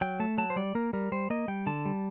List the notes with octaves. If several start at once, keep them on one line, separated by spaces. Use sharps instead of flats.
F#3 G5
A3 A5
F#3 A5
C5
G3 D5
A#3 A#4
G3 A#4
G3 C5
A#3 D#5
G3 G5
D3 A5
G3